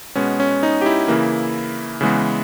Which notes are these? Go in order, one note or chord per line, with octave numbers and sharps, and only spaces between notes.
B2 G#3 B3 C#4
C#4
D#4
G4
E4
C#3 E3 A#3
C#3 E3 G#3 B3